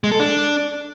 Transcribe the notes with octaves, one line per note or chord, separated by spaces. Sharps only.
G#3
A4
D4